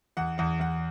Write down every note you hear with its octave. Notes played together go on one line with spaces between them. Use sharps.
E2 F#5
E2 F#5
E2 F#5